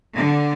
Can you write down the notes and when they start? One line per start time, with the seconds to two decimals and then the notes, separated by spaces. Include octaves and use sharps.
0.16 D3